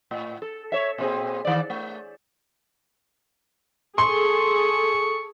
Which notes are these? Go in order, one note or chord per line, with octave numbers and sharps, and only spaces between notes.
A2
A4
C#5 E5
A#2 C4 G#4
D#3 D5
A3
G#4 A4 C6 C#6